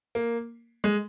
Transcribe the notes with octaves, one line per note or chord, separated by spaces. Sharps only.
A#3
G#3